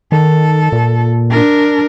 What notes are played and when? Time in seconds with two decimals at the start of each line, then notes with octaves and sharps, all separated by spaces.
0.12 D#3 A4
0.72 A#2
1.30 D4 A#4